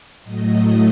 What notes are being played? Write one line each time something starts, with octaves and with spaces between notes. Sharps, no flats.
A2 F#3 A3 D#5